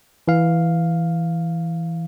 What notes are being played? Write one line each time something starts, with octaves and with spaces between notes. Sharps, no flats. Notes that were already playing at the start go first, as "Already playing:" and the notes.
E3 F5